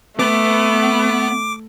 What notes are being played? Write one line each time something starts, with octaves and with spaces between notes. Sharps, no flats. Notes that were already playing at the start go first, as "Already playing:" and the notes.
A3 B3 D6